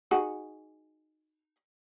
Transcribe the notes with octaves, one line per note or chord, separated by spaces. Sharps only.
D#4 F#4 G#4